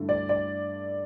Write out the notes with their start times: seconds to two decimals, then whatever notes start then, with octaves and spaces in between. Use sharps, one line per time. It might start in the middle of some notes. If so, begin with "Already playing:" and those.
Already playing: G2 D3 A3 E4
0.09 D5
0.29 D5